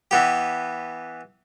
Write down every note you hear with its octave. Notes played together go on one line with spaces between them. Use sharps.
E3 B3 G4